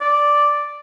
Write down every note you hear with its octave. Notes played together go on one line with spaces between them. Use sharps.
D5